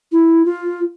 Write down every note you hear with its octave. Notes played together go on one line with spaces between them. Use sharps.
E4
F4